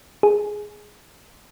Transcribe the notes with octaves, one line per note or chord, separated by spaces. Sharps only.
G#4